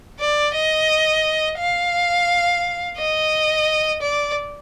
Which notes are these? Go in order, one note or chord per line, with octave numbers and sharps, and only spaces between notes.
D5
D#5
F5
D#5
D5